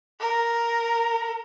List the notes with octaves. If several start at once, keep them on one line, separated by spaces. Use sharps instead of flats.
A#4